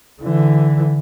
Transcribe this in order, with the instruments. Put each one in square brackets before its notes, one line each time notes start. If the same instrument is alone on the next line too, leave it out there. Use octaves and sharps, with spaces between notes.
[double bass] D3 E3